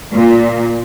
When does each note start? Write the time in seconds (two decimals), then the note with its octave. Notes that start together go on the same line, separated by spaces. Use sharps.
0.12 A#2